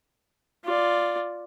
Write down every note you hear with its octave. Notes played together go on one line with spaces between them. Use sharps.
F4 D5